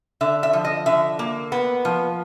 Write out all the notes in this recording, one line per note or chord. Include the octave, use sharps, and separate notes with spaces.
D3 E5
E5
F3
D#5
D3 E5
A#3
B3
F3